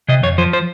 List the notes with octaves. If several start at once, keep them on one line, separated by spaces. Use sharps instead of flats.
C3 D#5
F2 C#5
F3 C5
C5